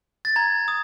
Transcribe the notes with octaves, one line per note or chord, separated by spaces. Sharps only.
A6
A#5 G#6
D#6